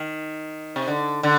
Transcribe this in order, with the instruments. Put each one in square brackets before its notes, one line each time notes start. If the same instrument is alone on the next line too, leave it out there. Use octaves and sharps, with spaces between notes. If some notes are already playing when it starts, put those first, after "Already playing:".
Already playing: [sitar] D#3
C3
D3
D3